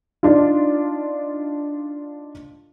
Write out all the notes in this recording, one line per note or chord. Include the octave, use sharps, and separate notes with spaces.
D4 D#4 F4